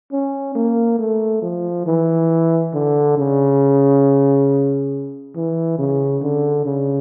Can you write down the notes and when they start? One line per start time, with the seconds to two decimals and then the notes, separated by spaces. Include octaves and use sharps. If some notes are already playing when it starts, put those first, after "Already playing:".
0.12 C#4
0.55 A#3
0.99 A3
1.42 F3
1.87 E3
2.74 D3
3.17 C#3
5.35 E3
5.78 C#3
6.23 D3
6.66 C#3